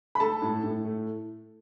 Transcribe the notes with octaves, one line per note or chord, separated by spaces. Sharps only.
B5
A3 A4 A5
A2
A2
A3